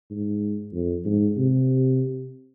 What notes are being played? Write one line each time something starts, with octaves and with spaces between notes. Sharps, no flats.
G#2
F2
G#2
C3